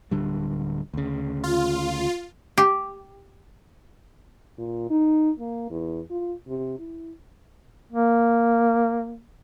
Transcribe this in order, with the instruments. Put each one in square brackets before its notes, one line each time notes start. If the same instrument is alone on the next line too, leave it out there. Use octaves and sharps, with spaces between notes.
[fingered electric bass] D1 D3 G3
D2 C#3
[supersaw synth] F4
[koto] G4
[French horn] A#2
D#4
A#3
E2
F4
C3
E4
[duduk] A#3